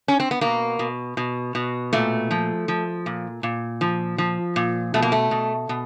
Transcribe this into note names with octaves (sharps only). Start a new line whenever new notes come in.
C#4
C4
B3
B2 A#3
B2
B2
B2
A#2 A3
F3
F3
A#2
A#2
F3
F3
A#2
B2 A3
A#3
A3
B2
B2